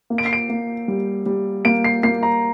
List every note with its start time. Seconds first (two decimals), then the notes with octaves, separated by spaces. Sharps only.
0.10 A#3
0.18 D7
0.26 C7
0.33 D7
0.49 A#3
0.88 G3
1.26 G3
1.65 A#3 D7
1.84 C7
2.03 A#3 C7
2.23 A#5